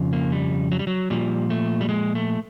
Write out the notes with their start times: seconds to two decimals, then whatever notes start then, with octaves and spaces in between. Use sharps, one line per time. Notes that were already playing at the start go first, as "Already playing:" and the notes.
Already playing: F2 C#3 F3
0.13 A#3
0.32 G3
0.72 F#3
0.79 G3
0.87 F#3
1.10 A#2 F3 G3
1.50 A3
1.81 G3
1.89 G#3
2.15 A3